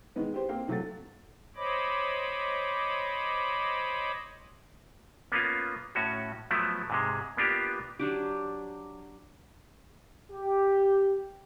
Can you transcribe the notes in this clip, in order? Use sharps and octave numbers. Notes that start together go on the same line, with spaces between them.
D#3 E3 G#3 B3 B4
G4 C5
A#3 C4 F5 G5
C3 F#3 A3 F#5 A6
C5 C#5 D#5 B5 D6
A#3 B3 C#4 F4
A2 C#4 F#4
F3 F#3 A3 B3 E4
G#2 C3 G#3
A#3 B3 D4 F4 G4
F#3 D4 G4
G4